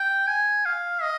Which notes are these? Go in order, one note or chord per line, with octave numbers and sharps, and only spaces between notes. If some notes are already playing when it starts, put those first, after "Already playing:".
Already playing: G5
G#5
F5
D#5